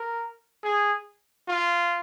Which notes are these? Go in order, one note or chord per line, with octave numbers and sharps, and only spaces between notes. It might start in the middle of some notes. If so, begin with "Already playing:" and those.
Already playing: A#4
G#4
F4